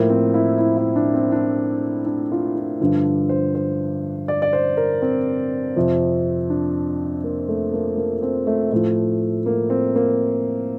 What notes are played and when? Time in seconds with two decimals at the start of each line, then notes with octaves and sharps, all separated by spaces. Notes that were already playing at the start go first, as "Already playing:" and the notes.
Already playing: A2 F3 A#3
0.10 C4
0.34 E4
0.58 E4
0.77 E4
0.96 D4
1.14 C4
1.32 D4
2.06 D4
2.32 F4
2.55 F4
2.80 G2 D3 F3 D4
3.29 C5
3.55 C5
4.28 D5
4.42 D5
4.53 C5
4.77 A#4
5.02 C4
5.76 F2 C3 F3
6.50 D4
7.24 A#3
7.48 A3
7.74 A#3
7.97 A#3
8.23 C4
8.47 A3
8.72 A2 F3 A3
9.46 A#3
9.70 C4
9.95 A#3